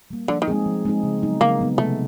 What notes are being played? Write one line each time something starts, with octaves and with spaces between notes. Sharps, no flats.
G3 A#3
D3 F3
D#3
G#3 C4 D#4 G#4
F3
G#3 C4 D#4 G#4
C#3
F#3 B3 D#4
C#3 A#3
F#3 B3 D#4
C3 A3